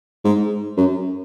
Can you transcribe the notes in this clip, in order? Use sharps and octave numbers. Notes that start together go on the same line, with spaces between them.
G#2
F#2